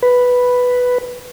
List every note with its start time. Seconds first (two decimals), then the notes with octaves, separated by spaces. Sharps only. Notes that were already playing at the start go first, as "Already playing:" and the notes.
0.03 B4